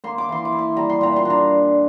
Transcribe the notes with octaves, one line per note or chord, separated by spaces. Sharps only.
A#3 C6
D6
E3 C6
D6
E4
C6
G3 A#5
C6
A#2 A#5
C6
D4 A#5